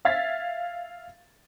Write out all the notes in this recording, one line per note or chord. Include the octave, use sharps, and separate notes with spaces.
E5 F5 G#6 A6 B6